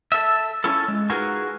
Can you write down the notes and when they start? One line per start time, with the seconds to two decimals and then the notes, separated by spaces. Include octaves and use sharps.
0.12 A4 E5
0.64 C#4 E4 F4 A4
0.88 G#3
1.10 D#4 F4 F#4 G#4 A#4 B4